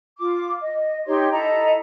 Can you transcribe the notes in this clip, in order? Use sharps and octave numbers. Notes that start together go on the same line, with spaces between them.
F4 D6
D#5
D#4 G4 C#5 C6
E4 A4 D#5 A#5